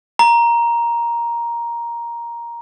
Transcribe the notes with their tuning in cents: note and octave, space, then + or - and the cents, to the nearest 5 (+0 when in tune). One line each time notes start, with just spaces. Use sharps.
A#5 +10